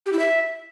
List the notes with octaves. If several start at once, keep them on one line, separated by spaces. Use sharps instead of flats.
G4
E4
E5